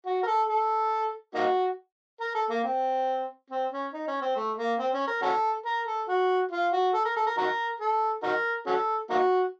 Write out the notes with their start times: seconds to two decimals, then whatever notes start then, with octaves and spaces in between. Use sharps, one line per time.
0.06 F#4
0.23 A#4
0.27 A4
0.49 A4
1.35 A#3 D#4 F#4
2.21 A#4
2.35 A4
2.50 A#3
2.64 C4
3.50 C4
3.71 C#4
3.93 D#4
4.08 C#4
4.22 C4
4.36 A3
4.58 A#3
4.79 C4
4.94 C#4
5.07 A#4
5.22 C#4 F#4 A4
5.66 A#4
5.87 A4
6.08 F#4
6.51 F4
6.73 F#4
6.94 A4
7.05 A#4
7.16 A4
7.27 A#4
7.38 D#4 F#4 A#4
7.80 A4
8.23 D#4 F#4 A#4
8.66 C#4 F#4 A4
9.10 A#3 D#4 F#4